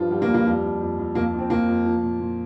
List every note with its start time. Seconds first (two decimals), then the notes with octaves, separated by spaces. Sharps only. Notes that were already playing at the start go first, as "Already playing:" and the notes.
Already playing: G2 F3 F4
0.11 G2 G3
0.22 A#3
0.28 G2
0.34 A#3
0.45 F2 G3
0.63 F2
0.80 F2
0.98 F2
1.15 F2 A#3
1.33 F2
1.39 C4
1.50 F2 A#3
1.68 F2
1.85 F3
2.03 A#2
2.20 A#2